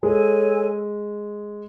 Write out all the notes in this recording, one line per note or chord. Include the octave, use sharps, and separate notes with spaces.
G#3 A4 C#5 G#5